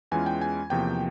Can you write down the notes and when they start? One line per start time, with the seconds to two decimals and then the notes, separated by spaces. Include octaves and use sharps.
0.12 E2 E3 G#3 C#4 F4 G#5
0.26 G5
0.42 G#5
0.70 E2 C3 F3 A#3 G5